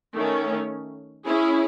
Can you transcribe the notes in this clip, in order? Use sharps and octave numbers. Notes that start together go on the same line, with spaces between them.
D#3 A3 C#4
C#4 E4 G#4